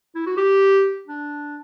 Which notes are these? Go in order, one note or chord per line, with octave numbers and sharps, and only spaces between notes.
E4
F#4
G4
D4